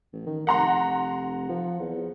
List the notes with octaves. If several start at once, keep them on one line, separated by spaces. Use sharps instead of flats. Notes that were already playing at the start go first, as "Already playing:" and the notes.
A1
D#3
F1 F#5 A#5 C6
F3
E2